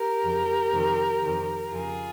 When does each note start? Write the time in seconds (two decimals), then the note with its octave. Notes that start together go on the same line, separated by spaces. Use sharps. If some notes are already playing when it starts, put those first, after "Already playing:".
Already playing: G4 A#4
0.23 F2 C#3
0.73 F2 C3 D#3
1.22 F2 C3 D#3
1.72 F2 C#3 F4 G#4